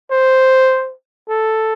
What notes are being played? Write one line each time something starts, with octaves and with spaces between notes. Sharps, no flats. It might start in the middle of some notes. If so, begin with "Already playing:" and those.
C5
A4